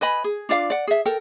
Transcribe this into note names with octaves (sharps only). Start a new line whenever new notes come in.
B4 D#5 G#5 B5
G#4
D4 F4 D5 F5
D5 F#5
G#4 E5
A4 A#4 G5